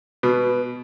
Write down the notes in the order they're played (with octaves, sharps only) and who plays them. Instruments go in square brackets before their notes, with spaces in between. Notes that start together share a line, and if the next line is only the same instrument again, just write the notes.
[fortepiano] B2 [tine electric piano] B4